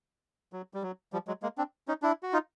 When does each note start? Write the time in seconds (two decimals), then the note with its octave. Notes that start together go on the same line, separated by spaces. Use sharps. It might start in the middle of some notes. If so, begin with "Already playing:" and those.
0.53 F#3
0.74 G3
0.83 F#3
1.13 F3 G3
1.28 F#3 G#3
1.42 G#3 A#3
1.58 C4 D4
1.88 C#4 D#4
2.02 D4 E4
2.23 F#4
2.33 D#4 F4